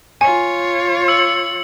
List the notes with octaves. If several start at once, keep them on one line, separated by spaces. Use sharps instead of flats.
F4 C#5 G#5
E6 C#7 F#7